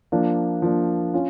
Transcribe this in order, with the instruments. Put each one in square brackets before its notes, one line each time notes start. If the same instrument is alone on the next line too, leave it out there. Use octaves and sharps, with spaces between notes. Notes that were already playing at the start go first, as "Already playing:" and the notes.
[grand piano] F3 A#3 D4
F3 A#3 D4
C#4 F4